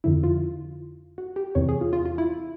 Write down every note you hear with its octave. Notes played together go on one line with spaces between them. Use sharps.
F2 D3 F3 E4
F4
F#4
G4
E2 C3 E3 C#5
G#4
F4
F4
F4
E4